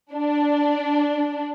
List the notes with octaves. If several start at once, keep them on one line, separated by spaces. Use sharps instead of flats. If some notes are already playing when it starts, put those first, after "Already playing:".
D4